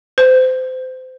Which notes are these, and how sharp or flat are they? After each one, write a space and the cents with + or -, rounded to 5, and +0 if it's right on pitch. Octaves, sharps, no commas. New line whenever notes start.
C5 -30